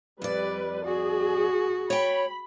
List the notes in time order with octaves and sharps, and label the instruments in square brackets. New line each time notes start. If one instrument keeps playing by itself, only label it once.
[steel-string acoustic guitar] F2 D5 [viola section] G3 B4
[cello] F#4 [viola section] G#4
[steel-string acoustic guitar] C#5 G5 [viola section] B5